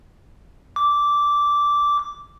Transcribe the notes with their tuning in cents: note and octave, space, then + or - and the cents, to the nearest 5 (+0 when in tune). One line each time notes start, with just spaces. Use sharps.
D6 -10